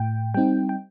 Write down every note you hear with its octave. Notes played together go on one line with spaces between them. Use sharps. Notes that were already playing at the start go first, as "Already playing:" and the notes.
Already playing: A2 G5
G3 C4 D#4 G5
G5